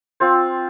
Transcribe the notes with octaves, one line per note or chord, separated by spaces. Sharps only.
C4 F4 C5